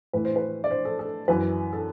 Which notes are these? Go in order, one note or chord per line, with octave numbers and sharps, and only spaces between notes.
A2 E3 B4
C5
B4
D5
C5
A4
A4
F#2 E3 B4
A4